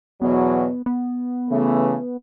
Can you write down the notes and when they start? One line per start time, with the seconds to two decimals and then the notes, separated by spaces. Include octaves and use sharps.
0.22 E2 B2 F#3 B3
0.86 B3
1.50 C#3 E3 A3